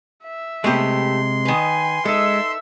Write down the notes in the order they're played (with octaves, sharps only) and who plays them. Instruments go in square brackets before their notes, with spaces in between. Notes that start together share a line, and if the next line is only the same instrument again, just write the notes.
[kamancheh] E5
[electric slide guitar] C3 G#3 [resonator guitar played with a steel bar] A3 B3 G4 [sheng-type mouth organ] C6
[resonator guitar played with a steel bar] D#3 B4 [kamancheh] G#5
[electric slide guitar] G#3 [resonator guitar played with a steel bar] D#4 A4 [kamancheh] E5 E6